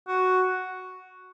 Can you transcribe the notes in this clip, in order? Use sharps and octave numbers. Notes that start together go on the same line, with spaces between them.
F#4